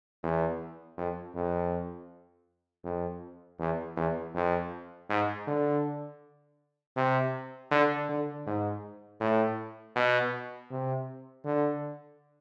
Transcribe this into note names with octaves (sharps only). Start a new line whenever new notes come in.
E2
F2
F2
F2
E2
E2
F2
G#2
D3
C3
D3
D3
G#2
A2
B2
C3
D3